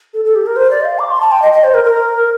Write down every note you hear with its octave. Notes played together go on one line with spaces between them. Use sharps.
A4
A4
G4
A#4
C5
D5
D#5
F5
D6
C6
A5
G5
D#5
D#5
C5
A#4
A#4